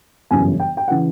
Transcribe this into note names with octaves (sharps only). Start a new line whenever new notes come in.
G1 F#2 C#3 E3 G3 G#5
G5
G5
C#3 E3 F#5